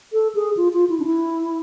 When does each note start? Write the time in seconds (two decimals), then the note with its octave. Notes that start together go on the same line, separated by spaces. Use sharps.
0.13 A4
0.35 G#4
0.57 F4
0.73 F4
0.90 E4
1.00 D4
1.05 E4